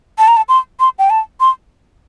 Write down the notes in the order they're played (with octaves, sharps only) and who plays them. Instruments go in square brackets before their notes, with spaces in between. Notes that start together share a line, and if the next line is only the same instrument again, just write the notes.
[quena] A5
A#5
A5
C6
C6
G5
A5
C6